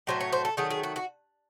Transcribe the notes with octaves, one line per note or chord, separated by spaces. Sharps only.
A2 F#3 A3 C5
C#5
C5
A4
D#3 F#3 A3 G#4
G#4
F#4
F#4